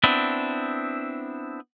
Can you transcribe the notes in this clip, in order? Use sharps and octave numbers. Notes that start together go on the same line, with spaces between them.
B3 C4 D4 E4